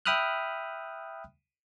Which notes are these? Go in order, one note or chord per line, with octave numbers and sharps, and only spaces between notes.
E5 G5 B5 D#6 F6 F#6